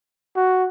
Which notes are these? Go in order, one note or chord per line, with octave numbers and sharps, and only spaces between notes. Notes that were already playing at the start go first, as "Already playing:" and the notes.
F#4